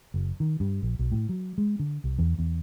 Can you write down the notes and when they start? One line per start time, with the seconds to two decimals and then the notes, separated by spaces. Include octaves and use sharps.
0.14 F#1
0.40 D#3
0.60 G2
0.83 A#1
0.99 B1
1.12 A2
1.29 F#3
1.58 G#3
1.79 D3
2.04 C2
2.19 E2
2.39 E2